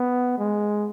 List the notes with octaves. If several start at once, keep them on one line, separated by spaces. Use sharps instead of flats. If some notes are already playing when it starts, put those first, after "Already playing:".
Already playing: B3
G#3